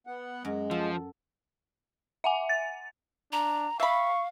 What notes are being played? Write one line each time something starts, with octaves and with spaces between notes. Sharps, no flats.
B3 F#5
F#2 G#3
F3 A4
E5 F#5 G#5
A6
D4 A#5
E5 F5 B5 C#6